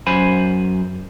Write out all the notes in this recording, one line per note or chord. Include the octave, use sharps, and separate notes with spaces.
F#2 C5 G#5 B5